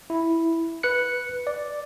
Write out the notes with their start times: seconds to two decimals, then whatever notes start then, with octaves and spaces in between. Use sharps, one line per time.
0.10 E4
0.83 B4 F#6 C#7
1.47 D5